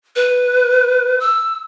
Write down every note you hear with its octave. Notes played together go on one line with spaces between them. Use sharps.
B4
E6